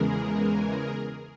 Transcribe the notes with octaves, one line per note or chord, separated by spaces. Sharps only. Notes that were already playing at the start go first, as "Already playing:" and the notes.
Already playing: E2 C#3 E3 G#3 G#4 A#4